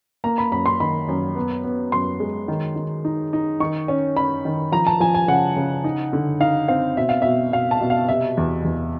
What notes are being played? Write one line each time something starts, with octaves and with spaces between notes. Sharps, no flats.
A#3 A#5
B5
F#2 B5
C6
D#3 B5
F#2
B3
B3
F#2 C6
G#3
D#3
D#3
D#4
D#4
D#3 C#6
C#4
C#4 B5
D#3
F3 A#5
A5
F3 G#5
G#5
C#3 F#5
C#3
D#4
D3
D#4 F5
C4 F5
B2 E5
F5
B2 E5
B2 F5
A5
B2
F5
C3 E5
E2
E2